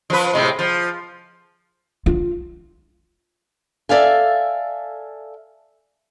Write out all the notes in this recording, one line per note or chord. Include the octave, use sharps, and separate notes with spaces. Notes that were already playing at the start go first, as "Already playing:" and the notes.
F3 B4
A2 C3 G#3
F3
F4
A4 D5 E5 F5 G#5